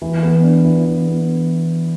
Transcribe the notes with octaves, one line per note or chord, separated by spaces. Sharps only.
E3
B3
D4
E3
E3
B3